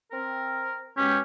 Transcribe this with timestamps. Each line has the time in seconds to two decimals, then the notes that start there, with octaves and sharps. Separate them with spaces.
0.11 C4 A#4
0.97 B2 G#3 C#4 G4